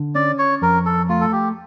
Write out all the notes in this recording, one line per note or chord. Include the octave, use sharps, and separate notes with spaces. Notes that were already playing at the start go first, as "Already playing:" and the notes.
Already playing: D3
C#4 D5
C#5
F2 A#4
A4
A3 F4
A4
G4